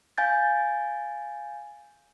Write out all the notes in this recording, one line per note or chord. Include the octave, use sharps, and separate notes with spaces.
F5 G#5 G6 A6